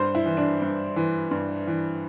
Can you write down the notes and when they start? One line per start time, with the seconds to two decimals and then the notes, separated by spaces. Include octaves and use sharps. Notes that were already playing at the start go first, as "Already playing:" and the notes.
Already playing: G2 C5
0.15 E4
0.26 E3
0.37 D4
0.61 G2
0.96 E3
1.31 G2
1.67 E3